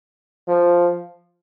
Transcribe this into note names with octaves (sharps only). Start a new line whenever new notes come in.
F3